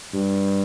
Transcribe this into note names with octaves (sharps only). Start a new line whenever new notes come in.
G2